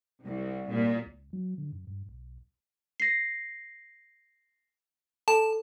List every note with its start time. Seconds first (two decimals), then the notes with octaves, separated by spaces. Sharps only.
0.23 C2
0.70 A#2
1.06 C#2
1.33 F#3
1.58 D3
1.72 F#2
1.87 G2
2.09 B1
3.00 A#6 C7
5.28 A4 A5